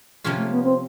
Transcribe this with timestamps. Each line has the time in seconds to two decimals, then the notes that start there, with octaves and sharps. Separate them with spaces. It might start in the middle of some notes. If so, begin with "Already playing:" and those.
0.24 C3 F3 A#3 C#4 F4
0.38 A3
0.51 B3
0.64 C4